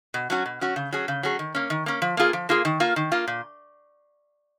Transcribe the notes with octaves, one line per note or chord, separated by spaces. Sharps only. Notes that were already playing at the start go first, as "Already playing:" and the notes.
B2
F#3 C#4 F#4
B2
F#3 C#4 F#4
C#3
F#3 C#4 G#4
C#3
F#3 C#4 G#4
D#3
A#3 C#4
D#3
A#3 C#4
F3
A#3 F4 G#4
F3
A#3 F4 G#4
D#3
A#3 F4
D#3
A#3 F4
A#2